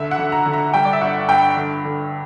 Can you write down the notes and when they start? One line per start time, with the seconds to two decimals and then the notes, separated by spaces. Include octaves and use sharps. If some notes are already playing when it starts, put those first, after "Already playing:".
Already playing: D2 D3 E5
0.11 F#5
0.18 D3
0.32 A#5
0.46 D3
0.53 A#5
0.74 G3 G5
0.85 D5
0.93 E5
1.01 G1 F#5
1.29 G2 G5
1.57 D3
1.85 D3